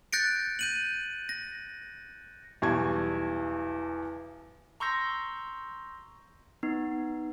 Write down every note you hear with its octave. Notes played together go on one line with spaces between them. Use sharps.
F#6 G6 A6 A#6 C#7 D7
G6 D#7 F#7
A#6
B1 E2 G3 A5 C#6 G#6
A#5 C6 C#6 E6 G6 A#6
B3 D#4